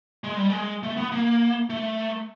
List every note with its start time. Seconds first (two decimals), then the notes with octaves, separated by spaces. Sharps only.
0.24 G#3
0.37 G3
0.50 G#3
0.83 A3
0.97 B3
1.12 A#3
1.70 A3